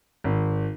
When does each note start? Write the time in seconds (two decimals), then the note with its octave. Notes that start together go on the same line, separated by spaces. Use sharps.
0.24 G#1